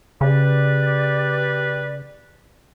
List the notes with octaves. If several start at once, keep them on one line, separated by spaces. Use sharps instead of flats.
C#3 G4 B4 D5